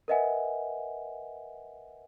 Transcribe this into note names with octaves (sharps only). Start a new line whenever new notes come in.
A#4 B4 D#5 E5 F#5 G#5